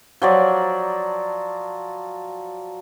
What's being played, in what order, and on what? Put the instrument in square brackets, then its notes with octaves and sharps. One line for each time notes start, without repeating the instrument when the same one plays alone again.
[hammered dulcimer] F3 F#3 D5